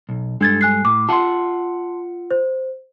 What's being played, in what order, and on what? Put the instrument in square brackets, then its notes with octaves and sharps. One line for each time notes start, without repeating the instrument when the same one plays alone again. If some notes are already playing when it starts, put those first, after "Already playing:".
[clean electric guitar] B1
[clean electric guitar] G2 G#3 A4 [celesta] D4 G#6 A6
[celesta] G#5 F#6 C7
[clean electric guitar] A2 [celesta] D6
[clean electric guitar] F4 E5 F#5 [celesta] A5 C6
[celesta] C5